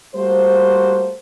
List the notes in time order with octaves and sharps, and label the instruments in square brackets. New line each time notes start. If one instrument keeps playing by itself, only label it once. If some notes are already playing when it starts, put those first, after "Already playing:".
[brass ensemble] G3 A3 A#3 F#4 C5